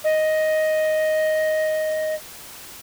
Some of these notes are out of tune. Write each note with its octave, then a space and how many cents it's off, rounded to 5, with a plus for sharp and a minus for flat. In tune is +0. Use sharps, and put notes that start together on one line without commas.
D#5 +5